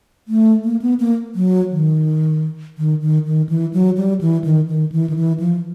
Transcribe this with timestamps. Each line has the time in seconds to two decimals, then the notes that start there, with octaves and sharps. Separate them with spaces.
0.28 A3
0.64 A#3
0.82 B3
1.00 A#3
1.35 F#3
1.71 D#3
2.78 D#3
3.02 D#3
3.26 D#3
3.49 E3
3.73 F#3
3.97 G3
4.21 E3
4.44 D#3
4.68 D#3
4.92 E3
5.10 D#3
5.16 E3
5.40 F3